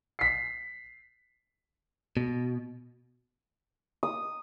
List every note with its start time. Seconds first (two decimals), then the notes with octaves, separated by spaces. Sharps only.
0.19 B6 C7
2.17 B2
4.03 D#6